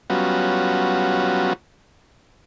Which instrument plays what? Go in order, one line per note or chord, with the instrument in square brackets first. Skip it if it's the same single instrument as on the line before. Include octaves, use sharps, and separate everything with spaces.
[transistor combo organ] F#3 G3 B3 C#4 F4 F#4